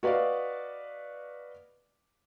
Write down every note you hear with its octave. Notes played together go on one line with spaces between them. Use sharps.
F#4 B4 D5 D#5 F5